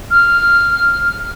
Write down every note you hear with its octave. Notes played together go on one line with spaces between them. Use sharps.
F6